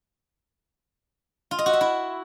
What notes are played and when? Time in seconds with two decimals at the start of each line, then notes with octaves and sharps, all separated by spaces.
1.51 F4
1.59 D#5
1.66 F#4
1.73 E5
1.81 E4